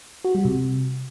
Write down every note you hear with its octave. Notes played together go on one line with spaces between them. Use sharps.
F#4
G3
C3